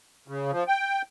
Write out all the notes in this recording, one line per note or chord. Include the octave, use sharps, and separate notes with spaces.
C#3
F3
G5